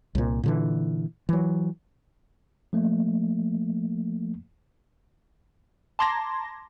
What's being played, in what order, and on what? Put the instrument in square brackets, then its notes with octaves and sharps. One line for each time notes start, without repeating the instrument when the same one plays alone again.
[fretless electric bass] C2 A#2
A#2 D3 E3
E3 F#3
[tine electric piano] F3 A3 A#3
[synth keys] A5 A#5 C6 D6 G#6 A#6